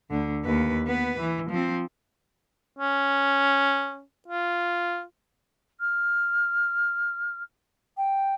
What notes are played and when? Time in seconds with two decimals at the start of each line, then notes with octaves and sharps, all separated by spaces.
0.10 D2 D3
0.44 D#2 B4
0.87 B3 B4
1.20 E3
1.50 F3 C4
2.78 C#4
4.28 F4
5.80 F6
7.97 G5